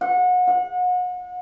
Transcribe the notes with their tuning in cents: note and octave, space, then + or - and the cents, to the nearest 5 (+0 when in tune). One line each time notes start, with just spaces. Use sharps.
F#5 -30
F#5 -35